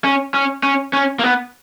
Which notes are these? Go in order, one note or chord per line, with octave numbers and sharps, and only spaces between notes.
C#4
C#4
C#4
C#4
A#3
B3